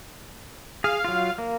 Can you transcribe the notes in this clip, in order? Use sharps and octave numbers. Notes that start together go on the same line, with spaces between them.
G#4 F5
F#3 F4
A#3